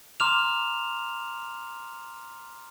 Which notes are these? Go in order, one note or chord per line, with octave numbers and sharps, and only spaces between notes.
A#5 C6 D6 F6 E7 F7